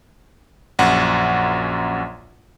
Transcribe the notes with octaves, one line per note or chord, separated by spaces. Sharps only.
A#1 F#2 F#5